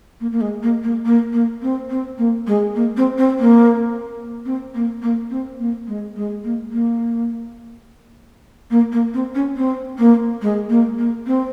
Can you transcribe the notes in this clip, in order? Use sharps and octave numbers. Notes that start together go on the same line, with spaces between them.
A#3
A#3
G#3
A#3
A#3
A#3
A#3
C4
C4
A#3
G#3
A#3
C4
C4
A#3
C4
A#3
A#3
C4
A#3
G#3
G#3
A#3
A#3
A#3
A#3
C4
C#4
C4
A#3
G#3
A#3
A#3
C4